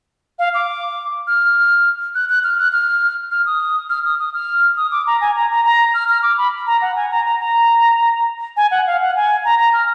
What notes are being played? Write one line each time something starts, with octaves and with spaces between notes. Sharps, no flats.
F5
D6
F6
F#6
F#6
F6
F#6
F6
F6
D#6
F6
D#6
D#6
F6
D#6
D6
A#5
G#5
A#5
A#5
A#5
F6
F6
D6
B5
A#5
F#5
G#5
A#5
A#5
A#5
G#5
F#5
F5
F#5
G#5
A#5
A#5
F6